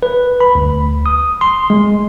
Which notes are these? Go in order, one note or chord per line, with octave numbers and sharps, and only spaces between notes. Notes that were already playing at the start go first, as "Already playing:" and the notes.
B4
B5
D2
D#6
C6
G#3